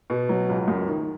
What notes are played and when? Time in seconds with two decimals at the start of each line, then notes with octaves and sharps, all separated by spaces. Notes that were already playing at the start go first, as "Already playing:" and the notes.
0.10 B2
0.29 F#3
0.49 C#2
0.68 F#2
0.88 D#3